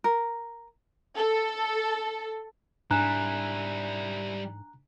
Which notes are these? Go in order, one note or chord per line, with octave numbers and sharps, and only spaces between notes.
A#4
A4
G#2 G3 D4 E4 G#5 A#5 F#6 E7